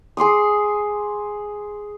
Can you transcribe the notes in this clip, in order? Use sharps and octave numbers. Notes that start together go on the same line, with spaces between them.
G#4 C6 D6 D#6